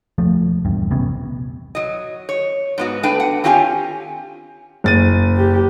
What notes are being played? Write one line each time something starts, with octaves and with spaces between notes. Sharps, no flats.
E1 F3 A3
D#1 E2 G2
A#1 C3 B3 C#4
F#3 D#5
C#5
G#2 B3 F#4
A3 D4 B4 G5
F#5
C4 C#4 F4 G4 F#5 G#5
F#1 A6 D#7
G4